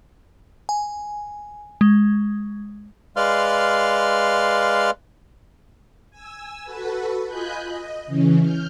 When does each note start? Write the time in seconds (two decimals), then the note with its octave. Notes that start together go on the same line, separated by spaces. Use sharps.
0.69 G#5
1.81 G#3
3.16 G#3 B4 D5 F5 C6 F6
6.10 G#5 E6
6.63 F#4 A4 B4
7.26 F4 D#5 G#5 B5 F#6 G6
7.68 D#5
8.07 C#3 E3 C#4
8.39 F6 G6